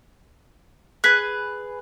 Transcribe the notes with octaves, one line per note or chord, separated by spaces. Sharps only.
G#4 B4 F#6 B6